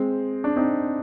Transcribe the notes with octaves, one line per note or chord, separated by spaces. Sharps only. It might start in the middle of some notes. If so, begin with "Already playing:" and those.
Already playing: G#3 C4
D4
C4 D#4